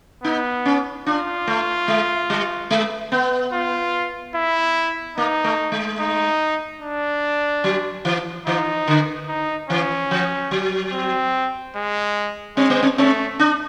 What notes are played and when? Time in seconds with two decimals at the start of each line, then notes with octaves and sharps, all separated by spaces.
0.23 B3 D#4
0.66 C#4
1.06 D4 F4
1.47 A3
1.88 G#3
2.30 G3
2.71 G#3
3.12 B3
3.53 F4
4.35 E4
5.17 A#3 D#4
5.44 A3
5.72 G#3
6.00 D#4
6.81 D4
7.64 F#3
8.05 E3
8.47 E3 D#4
8.88 D3
9.28 D#4
9.69 E3 C#4
10.11 F3
10.51 F#3
10.93 C4
11.76 G#3
12.57 G#3 C4
12.70 B3
12.83 C4
12.98 A3 C4
13.39 D4